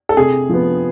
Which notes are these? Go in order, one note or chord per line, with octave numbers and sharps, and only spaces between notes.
A4
C3 G#4
F3 B3